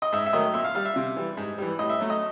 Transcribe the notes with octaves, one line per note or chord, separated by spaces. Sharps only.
D#5
G#2 E5
E5
D#3 F#3 A3 D#5
A#2 E5
F5
G3 F5
E5
C3
E3 G3
G#2
E3 G3
A2 D#5
E5
F#3 A3
D#5